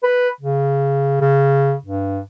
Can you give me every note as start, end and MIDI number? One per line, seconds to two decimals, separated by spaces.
0.03 0.29 71
0.41 1.19 49
1.21 1.75 49
1.85 2.21 43